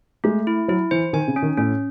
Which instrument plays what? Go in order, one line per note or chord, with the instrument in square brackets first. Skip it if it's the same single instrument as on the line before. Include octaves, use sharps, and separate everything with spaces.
[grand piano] G#3 [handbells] A3
[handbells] E4
[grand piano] F#3 [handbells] E4
[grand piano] E3 [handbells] C5
[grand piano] D#3 [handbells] G#5
[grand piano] C#3
[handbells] C#4
[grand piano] D#3
[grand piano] A2 [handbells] C#4